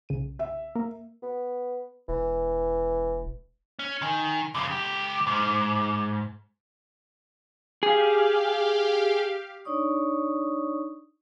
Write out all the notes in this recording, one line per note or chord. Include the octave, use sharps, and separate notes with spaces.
B1 C#3 D#7
E5
A#3 A#4
B3
E1 E3
C#4
D#3 G#5
F#2 C#3 D6
C#2 G4
G#2
G4 G#4 F5
D4 D#4 C#5 D5 C#6 D#6